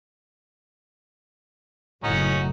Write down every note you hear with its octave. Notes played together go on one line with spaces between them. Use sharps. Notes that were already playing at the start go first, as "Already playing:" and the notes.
F#1 A2 C#4 D#4 F#4